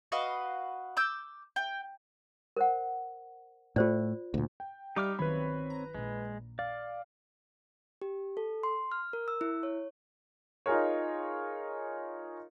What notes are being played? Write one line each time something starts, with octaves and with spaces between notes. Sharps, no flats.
F#4 B4 D#5 F5
D6 E6 G6
G5
A#4 C5 F#5
A2 A3 F4 C5 D5
D2 A#2
G5
G3 D#4 G4 E5 F5 D6 F6
G1 D#3 F#3 C4 B4 C#5 B5
A#5
A#1 A#2 G#3
D5 F5
G4
A4
C6
F6
A#4
E6
E4
C#5
D#4 F4 G#4 A#4 C#5